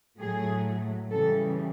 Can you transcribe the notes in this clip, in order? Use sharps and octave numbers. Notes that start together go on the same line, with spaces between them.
A2 F#3 A3 G#4
C#3 E3 G3 A4